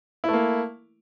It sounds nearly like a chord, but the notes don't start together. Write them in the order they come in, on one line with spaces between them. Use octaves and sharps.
E4 A3 A#3